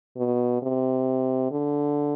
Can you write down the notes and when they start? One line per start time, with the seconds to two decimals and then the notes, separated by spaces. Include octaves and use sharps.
0.17 B2
0.62 C3
1.51 D3